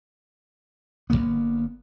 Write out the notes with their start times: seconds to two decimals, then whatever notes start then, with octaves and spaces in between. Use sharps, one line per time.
1.10 G1 F#2 A#3 B3